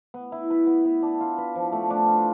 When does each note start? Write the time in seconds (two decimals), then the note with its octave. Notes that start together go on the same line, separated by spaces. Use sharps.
0.14 B3
0.32 E4
0.50 B4
0.67 B3
0.85 B3
1.03 D4
1.21 F4
1.38 B4
1.55 F3
1.72 A3
1.90 D4
2.08 F4